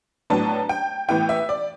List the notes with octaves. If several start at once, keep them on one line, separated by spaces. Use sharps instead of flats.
A2 F#3 B3 D4 A5
G5
A2 E3 B3 E4 G5
E5
D5